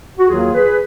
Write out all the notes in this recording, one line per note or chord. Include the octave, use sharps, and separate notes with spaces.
F#4
D#2 D#3 F#3 A#3 F4 G#4
G#4 B4